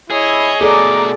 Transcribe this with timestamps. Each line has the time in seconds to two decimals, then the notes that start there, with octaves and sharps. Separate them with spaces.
0.10 E4 G#4 C#5 D#5
0.61 B2 A3 G#4 A4 D5 A#5 D6